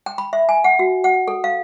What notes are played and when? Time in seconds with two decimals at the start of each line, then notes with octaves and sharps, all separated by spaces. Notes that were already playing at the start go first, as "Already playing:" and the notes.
0.06 G5
0.18 B5
0.33 E5
0.49 G#5
0.64 F#5
0.79 F#4
1.04 F#5
1.28 A4
1.44 F5